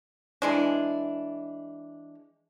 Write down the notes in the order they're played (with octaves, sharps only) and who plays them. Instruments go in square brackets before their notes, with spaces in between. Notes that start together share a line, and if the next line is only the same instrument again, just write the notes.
[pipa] E3 G#3 D4